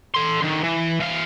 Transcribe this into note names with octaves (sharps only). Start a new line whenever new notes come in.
A4 C6
D3 D#3
E3
E3 F5